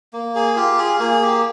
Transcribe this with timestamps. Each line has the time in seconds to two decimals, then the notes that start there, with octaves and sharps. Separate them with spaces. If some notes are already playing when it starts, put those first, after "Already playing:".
0.13 A#3
0.35 G#4
0.56 F4 G4
0.79 G#4
1.00 A#3 G#4
1.22 G4